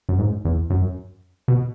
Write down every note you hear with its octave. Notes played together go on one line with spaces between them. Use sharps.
F#2
G#2
E2
F#2
B2